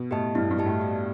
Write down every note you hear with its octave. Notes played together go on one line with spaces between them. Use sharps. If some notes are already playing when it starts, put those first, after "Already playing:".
Already playing: B2
A2 G4 D#5 A5
G2 E4
G2
G4 D#5 A5
A2
G4